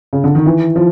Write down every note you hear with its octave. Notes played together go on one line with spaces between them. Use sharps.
C#3
D3
D#3
E3
F3